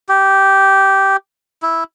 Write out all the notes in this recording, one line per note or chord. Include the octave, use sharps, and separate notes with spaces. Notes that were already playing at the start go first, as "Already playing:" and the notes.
G4
E4